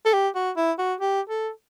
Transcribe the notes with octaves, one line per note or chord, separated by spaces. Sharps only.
A4
G4
F#4
E4
F#4
G4
A4